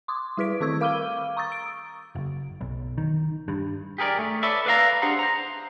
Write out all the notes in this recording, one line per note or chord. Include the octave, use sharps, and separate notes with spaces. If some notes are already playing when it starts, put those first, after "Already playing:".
C6 D6 D#6
G3 E4 G#4 B4 B6 D7
D#3 C4 A4 C#6 E6 G#6
A#4 F5 D6 F6 D#7 G7
A#5 C#6 D#6 E6 A6
D7
F#1
B1
D#3
G2
G4 G#4 A#4 B4 D5
A3
A4 B4 C#5 D5 E5
B4 D5 E5 F5 G5 A#5
D4 G4 G#4 C5 F#5 A#5
C5 A#5